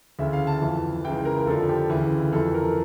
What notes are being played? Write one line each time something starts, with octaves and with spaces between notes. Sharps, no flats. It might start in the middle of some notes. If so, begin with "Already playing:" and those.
D2 C#3 E3 E5
F5
A5
F2 E3
C#2 C#3 E3 G5
A#4
F2 D3 F3 A4
G4
D2 C#3 E3
F2 E3 A4
A#4